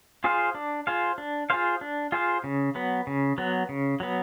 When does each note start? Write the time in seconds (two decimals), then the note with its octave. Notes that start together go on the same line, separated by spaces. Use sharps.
0.24 F4 G#4 C5 F5
0.55 D4
0.87 F4 G#4 C5 F5
1.18 D4
1.50 F4 G#4 C5 F5
1.81 D4
2.12 F4 G#4 C5 F5
2.44 C#3
2.75 F#3 B3
3.07 C#3
3.38 F#3 B3
3.69 C#3
4.00 F#3 B3